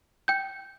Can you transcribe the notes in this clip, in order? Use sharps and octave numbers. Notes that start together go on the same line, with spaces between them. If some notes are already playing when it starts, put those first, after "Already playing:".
G5 G6